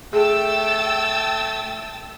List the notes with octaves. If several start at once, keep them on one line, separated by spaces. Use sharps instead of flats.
A3 G#4 G5 E6 A6